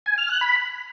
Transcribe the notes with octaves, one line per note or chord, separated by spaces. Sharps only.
G#5
F6
F#6
B5